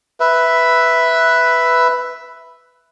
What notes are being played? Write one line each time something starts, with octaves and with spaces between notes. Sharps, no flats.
B4 E5